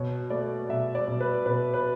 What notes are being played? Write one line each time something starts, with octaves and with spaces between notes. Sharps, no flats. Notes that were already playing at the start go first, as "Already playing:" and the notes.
Already playing: B2 C#5
A3 D5
B2 E5
D5
B2
B4
B2 B4
B4